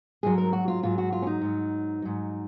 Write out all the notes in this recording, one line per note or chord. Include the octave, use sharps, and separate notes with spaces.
G#2 F#3 G#4
A#4
F#4
F4
G#2 F#3 F4
F#4
F4
C#4
D#4
G#2 F#3
G#2 F#3